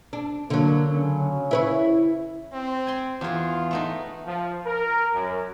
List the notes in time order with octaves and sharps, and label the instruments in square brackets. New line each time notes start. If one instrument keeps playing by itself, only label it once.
[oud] D4
[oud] D3 F#3 [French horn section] A#3 D4
[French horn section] C#3 C#4
[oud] E4 B4 C#5
[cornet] C4
[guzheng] G#5 C6
[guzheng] E2 G#4 [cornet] F4
[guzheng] A3 B3 D#4
[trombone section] F3
A#4
F#2